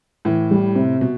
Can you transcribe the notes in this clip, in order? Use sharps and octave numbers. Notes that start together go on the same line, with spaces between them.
A2 E3
G3
C3
B2